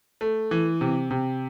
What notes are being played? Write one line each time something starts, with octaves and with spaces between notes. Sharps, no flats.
A3
E3
C3
C3